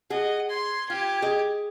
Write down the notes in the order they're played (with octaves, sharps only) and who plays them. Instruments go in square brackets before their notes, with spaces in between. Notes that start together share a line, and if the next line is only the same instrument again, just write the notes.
[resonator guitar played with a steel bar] G#4 [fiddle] D#5 [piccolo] F#5
[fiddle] C6 [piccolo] G#6
[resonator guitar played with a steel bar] F4 [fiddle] G4
[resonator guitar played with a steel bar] G#4 D#5